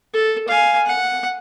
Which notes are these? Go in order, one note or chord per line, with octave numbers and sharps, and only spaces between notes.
A4
F5 G#5
F#5